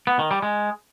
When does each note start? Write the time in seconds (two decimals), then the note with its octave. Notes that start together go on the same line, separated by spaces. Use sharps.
0.07 B3
0.19 D#3
0.31 G3
0.42 G#3